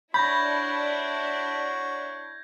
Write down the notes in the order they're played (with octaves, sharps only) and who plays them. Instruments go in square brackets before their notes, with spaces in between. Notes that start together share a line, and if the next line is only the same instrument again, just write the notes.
[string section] D4 E4 [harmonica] F#4 C#5 [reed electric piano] B5 [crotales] G6 G#6 A#6